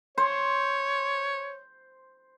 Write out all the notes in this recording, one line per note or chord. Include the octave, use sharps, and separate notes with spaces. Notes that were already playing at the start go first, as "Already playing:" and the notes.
C5 C#5